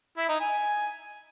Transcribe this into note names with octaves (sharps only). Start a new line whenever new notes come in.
E4
D#4
G#5